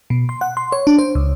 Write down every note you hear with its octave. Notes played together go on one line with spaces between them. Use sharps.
B2
C6
F#5
C6
C#5
D4
C5
C#2